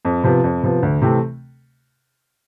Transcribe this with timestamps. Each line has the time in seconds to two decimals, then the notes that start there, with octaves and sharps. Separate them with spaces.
0.05 F2
0.24 C3 F3 B3
0.44 F2
0.63 C3 F3 B3
0.83 D2
1.02 C3 E3 A3 C4